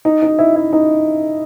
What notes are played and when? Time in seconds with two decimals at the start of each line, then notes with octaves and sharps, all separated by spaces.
0.05 D#4
0.22 D#4
0.39 E4
0.56 E4
0.73 D#4